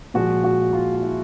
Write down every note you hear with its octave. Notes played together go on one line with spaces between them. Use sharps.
A#2 F3 G#3 F#4
F#4
F4
F4
E4